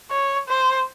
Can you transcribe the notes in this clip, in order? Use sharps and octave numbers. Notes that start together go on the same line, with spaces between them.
C#5
C5